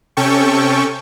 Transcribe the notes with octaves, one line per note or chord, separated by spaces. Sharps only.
C3 C#4 A4 G5 C#6